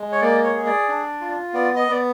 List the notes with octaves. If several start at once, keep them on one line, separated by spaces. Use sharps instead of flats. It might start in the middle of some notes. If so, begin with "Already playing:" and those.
Already playing: G#3
C#5
A#3 D5
C#5
G#4
D5
D4
F4
B3 D5
D#5
B3 D5